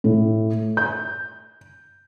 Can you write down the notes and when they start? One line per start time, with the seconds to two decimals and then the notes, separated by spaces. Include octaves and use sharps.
0.04 A2
0.77 G6